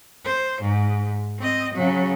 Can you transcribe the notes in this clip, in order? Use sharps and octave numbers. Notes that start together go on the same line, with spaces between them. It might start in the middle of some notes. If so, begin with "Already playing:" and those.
C5
G#2
C4 D#5
C#3 F#3